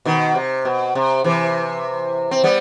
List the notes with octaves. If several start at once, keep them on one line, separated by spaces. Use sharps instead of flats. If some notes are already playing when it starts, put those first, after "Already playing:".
B2 D#3
C3
B2
C3
C3 E3
C4
G3 B3